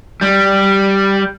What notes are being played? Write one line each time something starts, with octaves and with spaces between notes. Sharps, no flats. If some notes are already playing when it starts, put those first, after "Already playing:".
G3